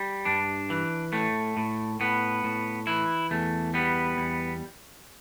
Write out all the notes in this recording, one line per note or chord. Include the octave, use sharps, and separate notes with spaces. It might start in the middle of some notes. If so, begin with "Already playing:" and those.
Already playing: G3
G2 D4
E3
A2 A3
A2
A2 B3
A2
E3 E4
E2 A3
G3 B3
E2